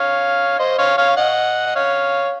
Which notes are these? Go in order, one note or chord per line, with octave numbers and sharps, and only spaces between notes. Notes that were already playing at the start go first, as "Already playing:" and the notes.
Already playing: C#5 F5
C5 D#5
C#5 F5
C#5 F5
D#5 F#5
D#5
C#5 F5